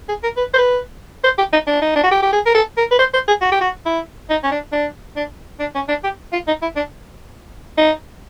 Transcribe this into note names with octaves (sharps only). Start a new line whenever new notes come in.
G#4
A#4
B4
C5
B4
C5
G4
D#4
D4
D#4
D4
F#4
G4
G4
G#4
A#4
A4
A#4
B4
C5
C5
G#4
F#4
G4
F#4
E4
D#4
C#4
D4
D4
D4
D4
C#4
D4
G4
F4
D#4
E4
D4
D#4